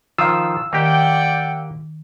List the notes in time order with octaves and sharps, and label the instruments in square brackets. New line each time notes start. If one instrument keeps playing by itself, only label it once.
[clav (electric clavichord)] D#3 F3 F4 [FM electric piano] F5 E6
[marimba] D#3 [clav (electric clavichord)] A#3 G4 [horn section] D5 F#5 G5